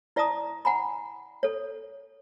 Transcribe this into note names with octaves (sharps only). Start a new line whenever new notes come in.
E4 D5 E5 A5 A#5 D#6
F#5 G#5 A#5 B5
A4 C#5